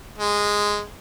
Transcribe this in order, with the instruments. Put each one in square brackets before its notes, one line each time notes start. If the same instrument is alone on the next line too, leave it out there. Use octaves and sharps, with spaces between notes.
[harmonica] G#3